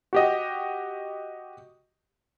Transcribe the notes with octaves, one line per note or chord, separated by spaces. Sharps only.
F#4 G4 D#5